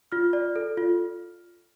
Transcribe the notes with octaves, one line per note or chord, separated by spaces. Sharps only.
F4 F6
D5
A4
F4